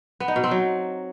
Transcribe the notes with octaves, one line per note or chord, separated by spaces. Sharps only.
B3
D#4
B2
C4
F#3